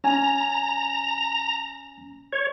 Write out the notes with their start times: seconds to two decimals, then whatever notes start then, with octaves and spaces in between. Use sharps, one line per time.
0.04 C#4 G#5 A#5
2.33 C#5